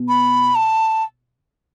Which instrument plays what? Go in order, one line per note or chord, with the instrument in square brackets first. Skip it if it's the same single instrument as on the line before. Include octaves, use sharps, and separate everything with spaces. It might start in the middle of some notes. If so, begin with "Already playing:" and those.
Already playing: [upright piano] B2
[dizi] B5
A5